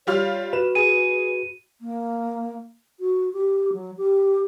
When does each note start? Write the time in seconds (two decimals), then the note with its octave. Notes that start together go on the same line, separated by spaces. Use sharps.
0.07 G3 F4 C#5 F6
0.53 F#4 B4 E7
0.75 G#4 D#7
1.81 A#3
3.00 F#4
3.33 G4
3.73 F#3
3.98 G4